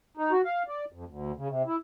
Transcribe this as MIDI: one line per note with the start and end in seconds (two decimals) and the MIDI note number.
0.17 0.31 63
0.32 0.41 66
0.45 0.62 77
0.68 0.85 74
0.92 1.04 41
1.07 1.32 38
1.37 1.48 49
1.49 1.63 48
1.66 1.76 64